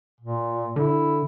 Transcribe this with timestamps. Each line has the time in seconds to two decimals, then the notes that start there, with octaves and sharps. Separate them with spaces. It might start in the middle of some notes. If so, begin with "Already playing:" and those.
0.21 A#2
0.76 D3 E4